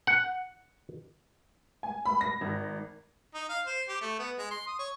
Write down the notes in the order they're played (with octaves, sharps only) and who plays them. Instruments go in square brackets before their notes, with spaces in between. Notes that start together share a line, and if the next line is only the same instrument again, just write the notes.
[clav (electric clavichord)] F#5
[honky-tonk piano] G#5
B5
A#6
G#1
[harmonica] D#4
F5
C5
G4
A3
B3
G#3
C6
D#6
C#5